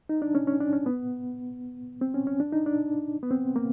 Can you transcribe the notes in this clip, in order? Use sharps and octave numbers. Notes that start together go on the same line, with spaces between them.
D#4
D4
C#4
C#4
D4
C#4
B3
C4
C#4
C#4
D4
D#4
D4
B3
C4
A#3